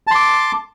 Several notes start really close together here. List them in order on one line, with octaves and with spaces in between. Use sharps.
A5 C6 D6